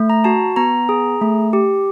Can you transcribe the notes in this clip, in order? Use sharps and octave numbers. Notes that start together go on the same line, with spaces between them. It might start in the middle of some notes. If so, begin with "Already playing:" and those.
Already playing: A3
A#5
F#4 A5
B3 A#5
G#4
A3
G4